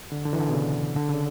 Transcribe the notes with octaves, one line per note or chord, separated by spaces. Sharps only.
D3
D3
E3
D3
B2
C#3
D3
C#3